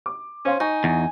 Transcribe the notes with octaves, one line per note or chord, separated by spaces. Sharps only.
D6
C#4 C5 F5 C6
D#4 G#5 C#6
E2